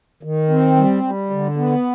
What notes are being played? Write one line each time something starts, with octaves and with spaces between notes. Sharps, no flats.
D#3
C4
G3
G3
D3
B3